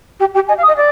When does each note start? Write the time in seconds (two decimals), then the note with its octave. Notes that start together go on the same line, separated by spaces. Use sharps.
0.20 G4 G5
0.34 G4 G5
0.48 D#5 G#5
0.58 F5
0.63 D#6
0.68 D#5
0.77 D5